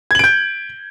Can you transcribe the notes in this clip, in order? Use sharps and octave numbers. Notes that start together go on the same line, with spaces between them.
G6 G#6 D7 F#7